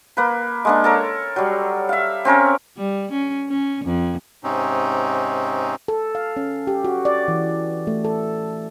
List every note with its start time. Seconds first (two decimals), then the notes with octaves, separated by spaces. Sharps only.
0.17 A#3 B4
0.65 G#3 A#3 D4
0.84 A4 A#4 C#5
1.36 F#3 G3
1.89 E5 F5
2.25 C4 C#4 A#4 C#5
2.77 G3
3.12 C#4
3.49 C#4
3.85 F2
4.44 G#2 C3 C4 C#4 D#4
5.88 A4
6.15 F5
6.37 C#4
6.67 G4
6.84 F#4
7.05 D5
7.28 E3
7.87 A3
8.05 A4